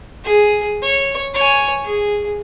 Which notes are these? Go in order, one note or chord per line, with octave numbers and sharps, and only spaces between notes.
G#4
C#5
C#5 G#5
G#4